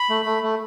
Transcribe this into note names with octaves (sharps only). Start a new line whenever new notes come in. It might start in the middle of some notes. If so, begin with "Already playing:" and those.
Already playing: B5
A3
A3
A3